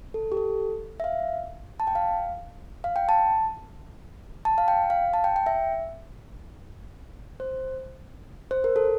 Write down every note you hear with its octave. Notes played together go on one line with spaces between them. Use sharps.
A4
G4
A4
E5
F5
A5
G5
F5
F5
G5
A5
A5
F5
G5
F5
A5
G5
G5
E5
C5
C5
A#4
A4